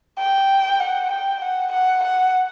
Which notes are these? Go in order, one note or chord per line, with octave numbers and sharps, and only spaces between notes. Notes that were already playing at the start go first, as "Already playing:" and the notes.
G5
F#5
G5
F#5
F#5
F#5